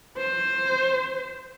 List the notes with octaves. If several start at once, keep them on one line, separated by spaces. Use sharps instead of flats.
C5